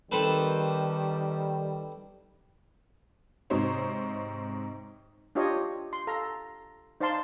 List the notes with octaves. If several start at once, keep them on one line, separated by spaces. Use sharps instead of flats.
D#3 G3 C4 A4 B4
G#2 C3 D#4 C5 C#5
D4 F4 G4 C#5 D#5
C6
A4 F5 A#5
D#4 C5 D5 F5 A5 C6